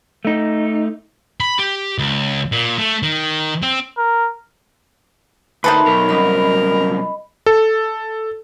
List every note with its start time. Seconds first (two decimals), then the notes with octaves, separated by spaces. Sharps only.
0.25 A3 D#4
1.40 B5
1.59 G4
1.98 C#2
2.52 A#2
2.78 A3
3.03 D#3
3.62 C4
3.98 A#4
5.64 D2 D#3 D#4 A4 B4 C5 E5 A5
5.86 B1 A#4
6.09 C2 F#2 D#5 B5
7.46 A4